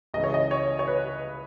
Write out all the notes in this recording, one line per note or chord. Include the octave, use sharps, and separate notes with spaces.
C#2 C#3 E3 D#5
C#5
D#5
C#5
C#5
B4